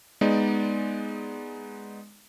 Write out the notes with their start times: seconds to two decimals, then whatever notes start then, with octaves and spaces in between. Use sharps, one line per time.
0.21 G#3 B3 D#4 D5